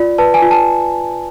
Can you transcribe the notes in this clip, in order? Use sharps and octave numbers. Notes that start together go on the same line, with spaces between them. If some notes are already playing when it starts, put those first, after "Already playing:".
Already playing: F4 D5
B4 A5
G#5
F4
A5